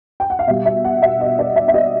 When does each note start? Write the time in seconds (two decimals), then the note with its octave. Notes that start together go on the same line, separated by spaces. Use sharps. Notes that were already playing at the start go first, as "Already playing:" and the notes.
0.20 G5
0.30 F#5
0.39 F5
0.47 B2 G3 E5
0.65 E5
0.84 F#5
1.02 E5
1.21 D#5
1.39 D5
1.56 E5
1.68 E5
1.74 D#5